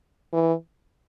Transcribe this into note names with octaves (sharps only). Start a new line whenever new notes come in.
E3